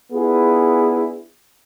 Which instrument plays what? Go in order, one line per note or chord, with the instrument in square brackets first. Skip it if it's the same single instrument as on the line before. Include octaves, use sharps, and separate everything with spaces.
[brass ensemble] B3 D4 E4 F4 G#4